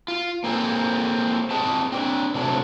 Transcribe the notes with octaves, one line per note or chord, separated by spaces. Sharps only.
F4
A#3 C4 G#4 A4
C4 G#4 B4 D#5 A5
C4 D4
C3 F#3 A3 D4